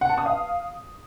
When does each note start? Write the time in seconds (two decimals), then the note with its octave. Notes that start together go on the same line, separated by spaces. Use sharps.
0.01 F#5
0.09 A5
0.18 D#6
0.26 F5